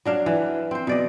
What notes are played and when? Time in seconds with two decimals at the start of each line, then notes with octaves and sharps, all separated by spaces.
0.05 F#3 D4 F5
0.26 E3 F#5
0.71 C4 C5
0.87 B2 D5 D#5